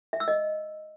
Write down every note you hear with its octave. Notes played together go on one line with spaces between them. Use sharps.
E5
E6
D#5